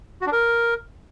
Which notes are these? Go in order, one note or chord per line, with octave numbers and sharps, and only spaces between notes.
F#4
D4
A#4